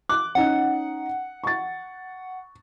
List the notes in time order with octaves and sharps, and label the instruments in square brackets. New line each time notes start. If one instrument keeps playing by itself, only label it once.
[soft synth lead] D6 [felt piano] F#6
[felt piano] C#4 D#4 [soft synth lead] F#5
[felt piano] C#6 A6